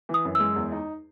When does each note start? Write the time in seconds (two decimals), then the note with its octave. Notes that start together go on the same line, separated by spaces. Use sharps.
0.09 E3
0.14 D#6
0.25 F#2
0.35 G#3 E6
0.56 E2
0.72 D#4